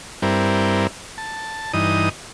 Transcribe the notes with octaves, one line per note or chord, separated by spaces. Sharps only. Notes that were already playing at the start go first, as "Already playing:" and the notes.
G2 G3 C4 E4 A#4
A5
G2 E3 D#4 D#6